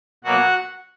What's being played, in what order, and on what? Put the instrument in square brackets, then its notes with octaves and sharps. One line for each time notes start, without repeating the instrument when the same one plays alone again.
[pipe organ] B2 F#3 A#3 F#4 F#5